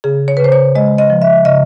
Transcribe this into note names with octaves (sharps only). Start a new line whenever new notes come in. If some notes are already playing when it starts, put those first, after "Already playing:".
C#3 G#4
C#5
B4
C#3 C5
C#5
G#3 D#5
D#5
F3
E5
C#3 D#5